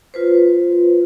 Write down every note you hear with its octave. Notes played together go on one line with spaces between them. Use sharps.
F4 B4 C5